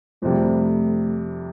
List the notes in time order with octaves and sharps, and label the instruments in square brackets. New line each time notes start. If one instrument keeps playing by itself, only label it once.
[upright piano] F2 C3 G3 [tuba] A3